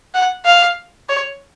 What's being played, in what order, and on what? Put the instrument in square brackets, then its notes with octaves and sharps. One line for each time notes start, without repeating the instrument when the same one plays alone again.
[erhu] F#5
F5
C#5